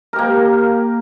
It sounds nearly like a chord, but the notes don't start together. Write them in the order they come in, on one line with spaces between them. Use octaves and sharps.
A#4 G4 A#3